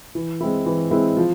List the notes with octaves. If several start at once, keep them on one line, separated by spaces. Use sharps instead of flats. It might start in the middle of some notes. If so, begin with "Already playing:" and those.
E3
G#3 C4 E4
E3
G#3 C4 E4
F3